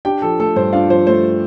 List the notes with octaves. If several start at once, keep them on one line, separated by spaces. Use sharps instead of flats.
D4 G4 G5
F3 A4
A3 A4
G2 C5
D4 F4 F5
F3 C5
A3 C5